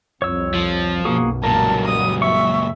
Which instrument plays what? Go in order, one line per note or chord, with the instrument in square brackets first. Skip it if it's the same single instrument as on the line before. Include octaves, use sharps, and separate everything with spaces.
[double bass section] C2 F2 [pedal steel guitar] C#5 E6
[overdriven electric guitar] F3
[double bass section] B1 F#2 [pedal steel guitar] A#3 F#4 G#4
[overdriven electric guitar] C#2 A#2 [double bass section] F#2 F#3 G3 [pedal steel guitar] A#4 [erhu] A5
[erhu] D#6
[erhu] E5 [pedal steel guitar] C#6